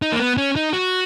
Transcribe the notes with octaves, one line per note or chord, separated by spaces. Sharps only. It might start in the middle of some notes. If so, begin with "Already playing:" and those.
D#4
A#3
B3
C#4
D#4
F#4